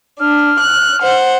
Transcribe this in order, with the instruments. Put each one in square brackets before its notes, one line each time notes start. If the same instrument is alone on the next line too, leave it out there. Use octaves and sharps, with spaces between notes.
[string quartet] D4 [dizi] F6
[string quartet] F#6
C5 F#5